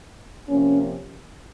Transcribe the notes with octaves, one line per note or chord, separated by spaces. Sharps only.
C3 F3 A#3 C#4